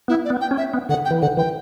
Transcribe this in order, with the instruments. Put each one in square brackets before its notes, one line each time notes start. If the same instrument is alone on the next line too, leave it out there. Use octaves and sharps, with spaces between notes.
[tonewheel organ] B3 [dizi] E4
[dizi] D5
[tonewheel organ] B3
[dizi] G5
[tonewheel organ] C#4
[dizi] E5
[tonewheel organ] B3
[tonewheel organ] D3 [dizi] F#5
[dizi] G5
[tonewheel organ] E3
[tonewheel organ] D3 [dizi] F#5
[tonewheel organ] E3 [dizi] G5